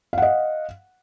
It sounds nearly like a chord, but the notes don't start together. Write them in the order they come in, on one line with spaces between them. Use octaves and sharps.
F5 F#5 D#5